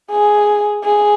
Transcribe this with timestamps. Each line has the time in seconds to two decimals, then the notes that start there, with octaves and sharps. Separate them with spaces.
0.11 G#4
0.84 G#4